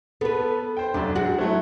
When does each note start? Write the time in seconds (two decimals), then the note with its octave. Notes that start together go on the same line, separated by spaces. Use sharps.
0.21 B3 A4 B4
0.77 C5 G5
0.94 F1 F#2 D4
1.15 G#3 F#4 F#5
1.39 F#3 A3 E4